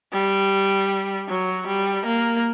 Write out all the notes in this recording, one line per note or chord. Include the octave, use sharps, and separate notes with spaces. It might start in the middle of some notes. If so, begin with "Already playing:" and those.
G3
F#3
G3
A#3